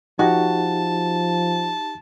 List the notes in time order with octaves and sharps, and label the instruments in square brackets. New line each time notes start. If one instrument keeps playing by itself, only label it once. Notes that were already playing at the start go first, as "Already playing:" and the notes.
[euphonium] F3 [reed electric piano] D#4 G4 [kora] F#4 [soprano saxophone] A5